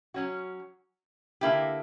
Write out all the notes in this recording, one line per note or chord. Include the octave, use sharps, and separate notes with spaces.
F#3 C#4 F#4
D3 A#3 E4 G4